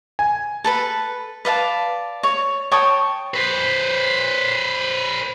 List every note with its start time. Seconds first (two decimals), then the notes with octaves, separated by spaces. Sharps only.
0.19 G#5
0.64 A4 B4 B5
1.45 B4 D5 F5 A5
2.23 C#5
2.72 C#5 G5 A5 D#6
3.34 B4 C5